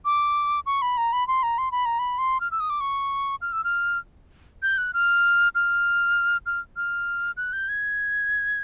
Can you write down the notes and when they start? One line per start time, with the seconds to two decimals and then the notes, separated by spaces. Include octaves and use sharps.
0.05 D6
0.66 C#6
0.82 B5
0.97 A#5
1.13 B5
1.28 C6
1.43 A#5
1.58 C6
1.72 B5
1.86 A#5
1.99 B5
2.18 C6
2.41 F6
2.51 E6
2.60 D#6
2.70 D6
2.81 C#6
3.42 F6
3.53 E6
3.64 F6
4.62 G6
4.78 F#6
4.94 F6
5.55 F6
6.46 F6
6.77 F6
7.37 F#6
7.53 G6
7.69 G#6